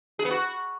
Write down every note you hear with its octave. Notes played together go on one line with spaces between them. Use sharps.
G#4
B3
F#4